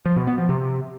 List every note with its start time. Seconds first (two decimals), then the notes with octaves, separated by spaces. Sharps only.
0.06 F3
0.16 B2
0.27 B3
0.38 F3
0.49 C3